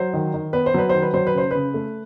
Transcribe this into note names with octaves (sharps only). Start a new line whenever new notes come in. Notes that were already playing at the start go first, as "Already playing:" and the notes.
Already playing: F#3 C5
D#3
D#3
B3 B4
C5
F#3 B4
D#3 C5
B4
F#3 C5
B4
C#3 C5
C#3 B4
A3